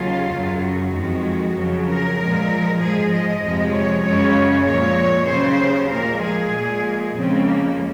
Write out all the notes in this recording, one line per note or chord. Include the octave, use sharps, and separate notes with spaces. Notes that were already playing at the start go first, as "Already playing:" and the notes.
Already playing: D#2 C#3 F#3 F4
F#2 C#3 F#3
F#4
F2 D#3 G#3
F2 C#3 F#3
A#4
A#2 F3 G#3
G#2 F3 G#3 G#4
D#5
F2 C3 F3 G#3
C#5
F#2 C#3 G#3 C#5
A#2 F3 G#3 C#5
D#2 C#3 F#3 C5
A#2 F3 G#3 A#4
G#4
A#2 G#3
F2 C#3 F3 G#3 C4
A#3